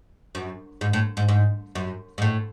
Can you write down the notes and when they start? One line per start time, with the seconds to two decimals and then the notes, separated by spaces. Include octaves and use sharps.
0.35 F#2
0.81 G#2
0.93 A2
1.17 G#2
1.29 G#2
1.75 F#2
2.18 G#2
2.22 A2